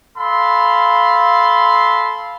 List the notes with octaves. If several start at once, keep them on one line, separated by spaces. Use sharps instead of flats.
A4 F5 B5 C6